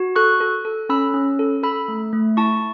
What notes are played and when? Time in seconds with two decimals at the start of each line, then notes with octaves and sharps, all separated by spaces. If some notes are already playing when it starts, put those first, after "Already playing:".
Already playing: F#4
0.16 A4 C#6 F#6
0.40 A4
0.65 A4
0.89 C#4 B5 E6
1.14 C#4
1.39 A4
1.63 A4 B5 E6
1.88 A3
2.13 A3
2.37 E4 A5 C#6